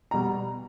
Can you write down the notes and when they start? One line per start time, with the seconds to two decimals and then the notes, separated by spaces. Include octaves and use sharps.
0.11 B2 G3 A#5